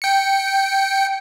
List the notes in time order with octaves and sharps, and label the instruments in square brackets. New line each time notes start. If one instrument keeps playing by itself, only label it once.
[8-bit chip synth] G5 C#7